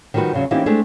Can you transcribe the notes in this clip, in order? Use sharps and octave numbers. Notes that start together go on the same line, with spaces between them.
D#3 F3 G3 F#4 B4
E2 C#3 F#3
E3 A#3 C4 C#4 D#4 G4
G#3 A3 C4 D4 G#4